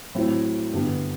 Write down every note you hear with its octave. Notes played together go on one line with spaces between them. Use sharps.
A2 F#3 C4 E4
G2 D3 G3 B3